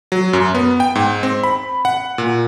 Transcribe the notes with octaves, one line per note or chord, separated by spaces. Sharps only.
F#3
F#2
B3
G5
G#2
C4
B5
F#5
A#2